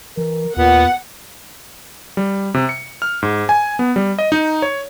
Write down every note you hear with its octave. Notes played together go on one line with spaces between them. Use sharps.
E3 A#4
D#2 A#2 B3 F#5
G3
C3
C#7
F6
G#2
G#5
B3
G3
D#5
D#4
C#5